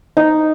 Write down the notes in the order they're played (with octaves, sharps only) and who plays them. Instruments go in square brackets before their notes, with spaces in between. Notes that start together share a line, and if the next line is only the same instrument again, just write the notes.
[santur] D#4